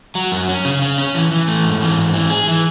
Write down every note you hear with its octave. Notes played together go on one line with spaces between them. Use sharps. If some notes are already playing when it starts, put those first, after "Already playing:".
F#3
F#2
C#4
C#3
C#3
C#4
E3
E3
A3
G#2
E3
G#2
E3
G#4
E3